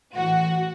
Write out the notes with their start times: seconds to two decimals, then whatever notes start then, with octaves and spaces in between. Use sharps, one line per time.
0.16 A2 E3 F#4